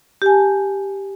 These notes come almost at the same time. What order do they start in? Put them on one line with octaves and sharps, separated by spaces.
G4 G#5 A5